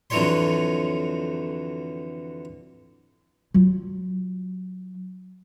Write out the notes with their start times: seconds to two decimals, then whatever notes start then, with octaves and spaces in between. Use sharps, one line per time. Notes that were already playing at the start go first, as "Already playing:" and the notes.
0.10 F2 D3 E3 F#3 C#5 C6
3.54 F#3 F4